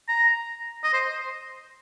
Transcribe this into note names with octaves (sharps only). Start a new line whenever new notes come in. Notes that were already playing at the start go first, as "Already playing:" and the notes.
A#5
D#5
C5